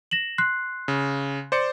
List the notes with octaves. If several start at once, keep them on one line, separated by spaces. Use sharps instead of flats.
A#6 E7 F#7
C6 F#6 C7
C#3
C5 D5 C#7